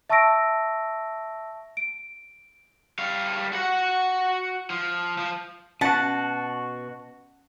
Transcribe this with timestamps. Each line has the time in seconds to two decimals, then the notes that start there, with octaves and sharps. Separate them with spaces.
0.10 E5 A5 C#6 E6 A#6 D7
1.77 D7
2.99 G3 F5
3.53 F#4 F#5
4.70 F3
5.18 F3
5.81 B2 C#4 F#4 F#5 A5